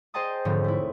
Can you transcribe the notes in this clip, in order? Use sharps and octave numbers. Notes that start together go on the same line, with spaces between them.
G#4 C5 D#5 G5 A5 D#6
E1 G#2 D3 F3 C4 C#5
A3 E4